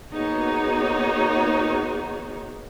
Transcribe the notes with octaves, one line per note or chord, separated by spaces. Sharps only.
A#3 B3 D#4 F#4 G#4 C#5